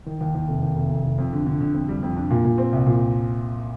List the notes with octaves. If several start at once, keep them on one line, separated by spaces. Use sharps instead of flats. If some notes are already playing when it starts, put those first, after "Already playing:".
D#3
D#2
D#2
F1
D#2
F1
F1
F1
F2
D3
D3
D3
F2
G3
F2
D4
A#2
A#2
C4
C2
A#2